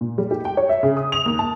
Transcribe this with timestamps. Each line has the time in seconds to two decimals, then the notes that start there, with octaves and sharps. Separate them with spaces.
0.01 A#2
0.18 G3
0.31 G4
0.45 G5
0.57 C#5
0.69 E5
0.83 C#3
0.97 D#6
1.12 F7
1.26 D#2
1.39 A5